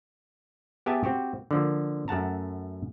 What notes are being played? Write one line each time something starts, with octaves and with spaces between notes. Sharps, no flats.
B3 G4 G#4 E5 G#5 A5
C4 F#4 G4
D3 F3 A#3
F#2 A3 F#5 A5 A#5